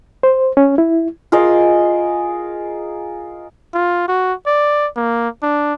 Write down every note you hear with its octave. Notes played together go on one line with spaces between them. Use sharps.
C5
C#4
E4
F4 G#4 A#4 D#5
F4
F#4
D5
A#3
D4